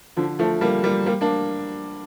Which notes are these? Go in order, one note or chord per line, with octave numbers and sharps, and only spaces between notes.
D3 F3
F3 A3
G3 A#3
G3 A#3
G3 A#3
A#3 D4